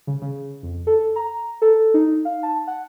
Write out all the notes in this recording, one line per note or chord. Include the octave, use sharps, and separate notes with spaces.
C#3
C#3
F2
A4
A#5
A4
D#4
F5
A5
F#5